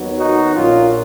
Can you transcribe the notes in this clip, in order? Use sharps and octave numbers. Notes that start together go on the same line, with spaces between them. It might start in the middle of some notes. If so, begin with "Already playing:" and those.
Already playing: D#2 D#3 F#3 B3
D#4 F#4
A#1 A#2 F#3 A#3 C#4 F4